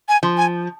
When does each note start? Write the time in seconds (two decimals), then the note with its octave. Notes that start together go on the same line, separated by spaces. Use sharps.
0.09 G#5
0.23 F3
0.37 G#5